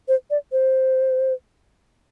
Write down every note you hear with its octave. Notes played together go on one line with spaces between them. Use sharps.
C5
D5
C5